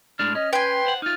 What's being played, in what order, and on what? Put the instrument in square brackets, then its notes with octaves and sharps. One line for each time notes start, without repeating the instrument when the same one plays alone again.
[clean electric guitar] A2 G#3 D4 [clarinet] F6
[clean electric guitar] C#4 [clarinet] D#5 [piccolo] F6
[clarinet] B4 [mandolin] G5 G#5 [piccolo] C6
[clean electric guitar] C5 F#5
[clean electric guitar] D#4 F4 [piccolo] F6